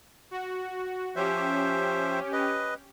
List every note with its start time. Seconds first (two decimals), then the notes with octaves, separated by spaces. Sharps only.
0.31 F#4
1.16 F3 C#4 G4 C5 E5
2.33 B4 D#5